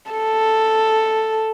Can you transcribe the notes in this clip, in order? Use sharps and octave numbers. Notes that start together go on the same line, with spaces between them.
A4